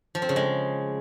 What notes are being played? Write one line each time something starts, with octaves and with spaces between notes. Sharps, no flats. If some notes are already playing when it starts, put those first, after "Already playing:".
F3
C4
C#3
G#3